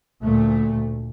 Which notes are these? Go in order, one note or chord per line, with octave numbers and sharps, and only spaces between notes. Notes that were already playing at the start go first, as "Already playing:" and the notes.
D2 A#2 A3